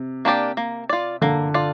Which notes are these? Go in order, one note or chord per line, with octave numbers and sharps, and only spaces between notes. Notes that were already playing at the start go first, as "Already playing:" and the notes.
Already playing: C3
A#3 D4 G4 D5
A#3
F4 D5
D3 A#3
F4 D5